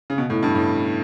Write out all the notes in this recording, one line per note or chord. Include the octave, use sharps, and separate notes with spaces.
C#3
B2
A2
G2
A2